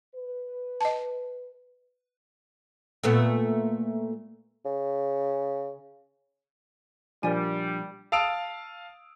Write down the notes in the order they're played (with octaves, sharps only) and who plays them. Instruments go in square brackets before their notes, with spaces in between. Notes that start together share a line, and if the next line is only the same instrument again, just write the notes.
[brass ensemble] B4
[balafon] D#5 A5
[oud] A#2 A3 B3
[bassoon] C#3
[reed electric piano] A#2 F3 D4 [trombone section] G3 [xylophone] A#4 D5 G#5
[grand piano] F5 A5 D#6 E6 D7 F7